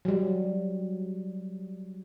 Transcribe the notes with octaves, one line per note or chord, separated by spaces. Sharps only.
F#3 G3